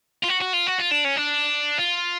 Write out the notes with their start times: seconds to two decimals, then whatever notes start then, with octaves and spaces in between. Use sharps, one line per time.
0.23 F4
0.28 F#4
0.41 F#4
0.53 F4
0.67 F#4
0.79 F4
0.91 D4
1.04 C#4
1.16 D4
1.79 F4